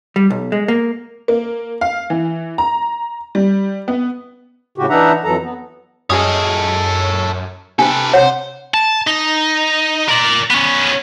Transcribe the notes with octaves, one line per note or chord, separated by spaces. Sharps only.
G3
B1
G#3
A#3
A#3
F5
E3
A#5
G3
B3
A2 C#3 F#4 G4
E3 D4 D#4 E5 F#5 A#5
F2 E3 F#3 A4 A#5
B3
F#2 C#4 G#4 A4 C#5 D#5 D#6
C3 D4 G4 A4 B4
C5 C#5 F#5
A5
D#4
A#4 D5
B3 C#4